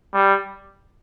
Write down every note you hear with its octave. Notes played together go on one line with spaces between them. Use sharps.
G3